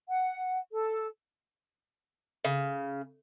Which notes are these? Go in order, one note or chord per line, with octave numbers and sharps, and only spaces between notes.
F#5
A4
C#3